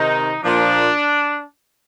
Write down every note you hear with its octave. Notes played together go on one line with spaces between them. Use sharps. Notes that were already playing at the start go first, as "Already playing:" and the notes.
Already playing: C3 D#3 D#4
A#2 F3 D4